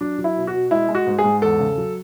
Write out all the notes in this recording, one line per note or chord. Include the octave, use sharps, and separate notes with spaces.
F#3 D4
F#3
E4
B2
F#4
B2
G#3 E4
G#3
F#4
G#2
G#4
G#2
E2 A4
C#3
F#3